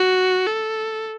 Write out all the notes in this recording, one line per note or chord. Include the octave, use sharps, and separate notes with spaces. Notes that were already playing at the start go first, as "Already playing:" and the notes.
Already playing: F#4
A4